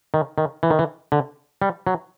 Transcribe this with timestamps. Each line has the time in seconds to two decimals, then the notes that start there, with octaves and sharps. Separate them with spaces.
0.14 D#3
0.38 D#3
0.63 E3
0.70 D#3
0.79 E3
1.12 D3
1.62 G3
1.87 F#3